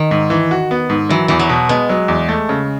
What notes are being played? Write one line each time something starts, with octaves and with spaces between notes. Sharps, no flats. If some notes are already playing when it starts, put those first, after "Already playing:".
Already playing: D#3
G#2
E3
F#4
B3
G#2
E3 F#3
E2 E3
F#3
B2
G#3 B3
F#3
E2
A3
C#3